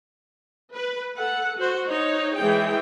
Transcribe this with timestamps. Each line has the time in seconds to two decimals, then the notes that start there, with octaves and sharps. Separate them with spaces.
0.74 B4
1.14 A4 F#5
1.57 F#4 C5
1.89 D#4 C#5
2.36 E3 G#3 G#4 G5